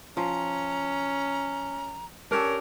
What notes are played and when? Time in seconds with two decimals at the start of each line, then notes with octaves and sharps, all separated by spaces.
0.17 F3 C#4 A#5
2.31 C#4 D4 G4 A4 A#4